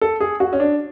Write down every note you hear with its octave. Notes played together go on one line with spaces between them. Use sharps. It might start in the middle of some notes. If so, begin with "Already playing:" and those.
A4
G#4
F#4
C#4
D4